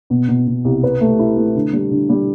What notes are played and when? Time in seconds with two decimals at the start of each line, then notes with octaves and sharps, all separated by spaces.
0.10 B2
0.28 B2
0.47 B2
0.65 C2
0.83 B4
1.01 A3
1.19 E4
1.37 A3
1.55 D3
1.73 G3
1.91 D3
2.09 G3